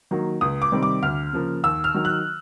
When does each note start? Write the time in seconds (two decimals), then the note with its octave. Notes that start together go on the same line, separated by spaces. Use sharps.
0.11 D#3 F#3 A#3
0.41 C#2 D#6
0.62 D6
0.72 C3 D#3 G3 C4
0.83 D6
1.02 D2 F6
1.33 C#3 F3 A#3
1.64 D#2 E6
1.84 F6
1.94 D#3 F#3
2.05 F#6